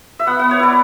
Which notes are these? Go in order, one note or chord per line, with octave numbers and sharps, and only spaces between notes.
E5
B3 F#5
B3 F#5
C#5
E4 D5